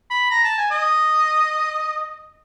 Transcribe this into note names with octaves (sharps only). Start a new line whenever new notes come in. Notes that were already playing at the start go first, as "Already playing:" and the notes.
B5
A#5
A5
G#5
D#5